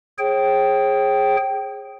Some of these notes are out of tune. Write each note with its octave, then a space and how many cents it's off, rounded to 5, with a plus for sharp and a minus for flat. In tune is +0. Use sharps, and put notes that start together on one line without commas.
G#4 +0 C#5 -45 G5 -15